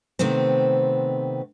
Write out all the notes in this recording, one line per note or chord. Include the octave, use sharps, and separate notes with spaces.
C3 D#3 A3 B3 C4